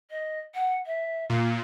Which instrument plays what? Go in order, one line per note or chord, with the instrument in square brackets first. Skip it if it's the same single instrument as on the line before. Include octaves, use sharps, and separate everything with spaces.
[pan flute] D#5
F#5
E5
[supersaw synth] A#2 [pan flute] F5